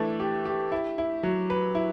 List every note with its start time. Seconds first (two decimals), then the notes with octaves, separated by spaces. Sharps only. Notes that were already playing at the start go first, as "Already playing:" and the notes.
Already playing: E3 A3 D4
0.20 G4
0.45 G4
0.72 E4
0.98 E4
1.23 F#3
1.50 B4
1.75 E4